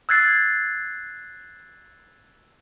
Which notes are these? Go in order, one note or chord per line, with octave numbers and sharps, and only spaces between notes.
E6 F#6 G#6 A6 C7